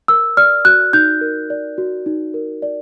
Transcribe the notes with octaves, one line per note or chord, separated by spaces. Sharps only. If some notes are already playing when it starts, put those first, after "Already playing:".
A#4 E6
D5 F6
F#4 F#6
D#4 G6
A#4
D5
F#4
D#4
A#4
D5